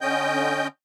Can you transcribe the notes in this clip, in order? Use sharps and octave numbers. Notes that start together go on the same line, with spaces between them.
D3 C#4 D#5 G5 G6